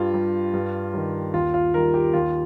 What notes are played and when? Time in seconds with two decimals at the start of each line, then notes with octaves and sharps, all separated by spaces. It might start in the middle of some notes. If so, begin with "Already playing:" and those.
Already playing: G2 F4
0.14 G3
0.54 G2
0.94 D#3 G3
1.34 D#2 F4
1.54 F4
1.74 D#3 G3 A#4
1.94 G4
2.13 D#2 F4